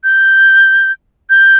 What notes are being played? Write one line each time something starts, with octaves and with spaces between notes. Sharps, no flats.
G6
G6